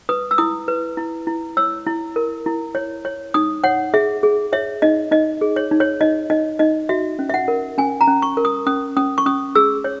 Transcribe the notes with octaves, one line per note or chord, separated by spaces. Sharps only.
B4 D#6
E6
E4 D#6
B4
E4
E4
C#5 E6
E4
A#4
E4
C#5
C#5
D#4 D#6
C#5 F#5
G#4 E5
G#4
C#5 E5
D#4 D#5
D#4 D#5
G#4
C#5
D#4
C#5
D#4 D#5
D#4 D#5
D#4 D#5
F#4 E5
C#4
E5
F#5
A#4
C#4 G#5
A#5
C#4
C#6
A#4
D#6
C#4 D#6
C#4 D#6
C#6
C#4 D#6
G#4 E6
C#5